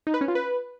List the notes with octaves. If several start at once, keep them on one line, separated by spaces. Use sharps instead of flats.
D#4
B4
C#4
F4
B4